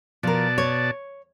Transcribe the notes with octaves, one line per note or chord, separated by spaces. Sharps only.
B2 F3 A#4 D5 A5
C#5